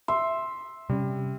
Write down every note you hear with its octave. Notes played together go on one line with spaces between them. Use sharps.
E5 C6
C3 G3 C#4